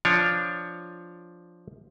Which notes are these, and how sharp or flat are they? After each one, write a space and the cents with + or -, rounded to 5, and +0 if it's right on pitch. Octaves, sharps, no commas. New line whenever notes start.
F3 +0 D4 +0 C#5 +0